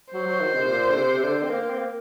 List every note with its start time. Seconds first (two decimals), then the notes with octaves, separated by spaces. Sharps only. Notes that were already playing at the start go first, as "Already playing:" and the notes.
0.13 F#3 C5
0.27 F#3
0.40 D#3
0.54 C3
0.68 A#2
0.89 D3
0.96 C3
1.18 C3
1.23 D3
1.43 C4
1.50 A#3
1.70 C4
1.78 A#3